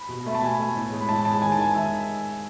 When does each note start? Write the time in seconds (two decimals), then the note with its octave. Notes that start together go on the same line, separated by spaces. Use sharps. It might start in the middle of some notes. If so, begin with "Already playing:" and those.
Already playing: B5
0.09 B2
0.26 A3 B5
0.35 A5
0.43 B2 G#5
0.59 A3
0.76 A2
0.92 G#3
1.01 B5
1.09 A2 A5
1.25 G#3 A5
1.42 D#3 G#5
1.52 A5
1.58 G#3 G#5
1.75 D#3 E5